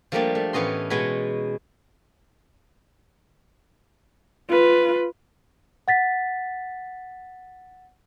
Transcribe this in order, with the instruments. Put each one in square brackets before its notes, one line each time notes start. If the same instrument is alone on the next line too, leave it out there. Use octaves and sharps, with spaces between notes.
[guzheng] F3 G3 A3 A#3 D4 G4
A3
A2 E3 B3 C#4 D#5 C6
B2 G#3 B3 C#5 B5
[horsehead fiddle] F4 B4
[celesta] F#5 A6 B6